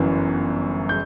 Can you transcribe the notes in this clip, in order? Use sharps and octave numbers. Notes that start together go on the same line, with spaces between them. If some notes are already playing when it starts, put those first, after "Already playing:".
Already playing: G1 F#2 E3
G6